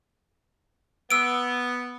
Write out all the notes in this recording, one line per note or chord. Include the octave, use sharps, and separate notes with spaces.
B3 E6 D7